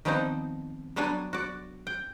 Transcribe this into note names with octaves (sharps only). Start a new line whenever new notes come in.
D#3 F3 G3 B3 C4 D#4
F#3 G3 B3 D4 G#5
F#4 D5
G5